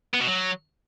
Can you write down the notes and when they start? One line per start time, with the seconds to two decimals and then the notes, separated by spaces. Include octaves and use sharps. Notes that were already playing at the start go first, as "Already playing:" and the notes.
0.14 B3
0.21 B2
0.27 F#3